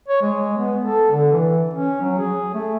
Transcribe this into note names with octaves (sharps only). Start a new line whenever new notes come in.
C#5
G#3
B3
A4
D3
E3
C#4
F#3
G#4
A3